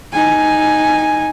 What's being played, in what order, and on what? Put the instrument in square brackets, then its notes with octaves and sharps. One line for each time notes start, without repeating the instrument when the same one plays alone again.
[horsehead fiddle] D#4 G#5